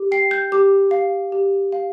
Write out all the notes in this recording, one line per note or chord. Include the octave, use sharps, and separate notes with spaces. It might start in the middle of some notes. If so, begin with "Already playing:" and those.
Already playing: G4
G5 C7
G6
G4 D6
F5
G4
F5